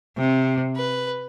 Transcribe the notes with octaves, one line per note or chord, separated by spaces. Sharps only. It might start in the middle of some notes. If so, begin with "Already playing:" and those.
C3
B4